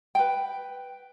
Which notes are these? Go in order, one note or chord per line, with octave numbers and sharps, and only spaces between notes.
B4 G5